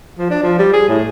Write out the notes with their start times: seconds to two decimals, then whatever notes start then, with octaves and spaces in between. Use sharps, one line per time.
0.18 F3
0.30 D4
0.43 F3
0.59 G3
0.73 G#4
0.88 A2